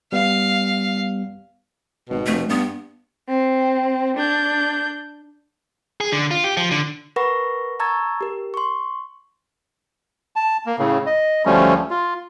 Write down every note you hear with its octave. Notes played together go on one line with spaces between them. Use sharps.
G3 B3 F5
G#1 B2
F1 A3
G2 B3
C4
D4 G6
G#4
D3
F4
G4
F3
D3
A#4 B4 F#5 B5 C#6 A#6
A5 A#5 C#6 E6 G#6 A6
G4 A#4
C6 C#6
A5
A#3
A2 C#3
D#5
D2 F3 G3 A3 C#4
F4